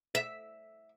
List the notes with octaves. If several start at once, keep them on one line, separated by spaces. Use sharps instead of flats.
E5